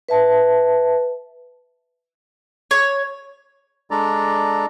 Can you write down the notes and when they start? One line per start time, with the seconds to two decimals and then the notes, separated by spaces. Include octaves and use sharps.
0.09 B4 E5 A5
2.71 C#5
3.91 G#3 D4 A4 D5 A#5